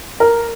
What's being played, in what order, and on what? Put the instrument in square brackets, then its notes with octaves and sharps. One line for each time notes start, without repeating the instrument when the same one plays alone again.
[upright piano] A#4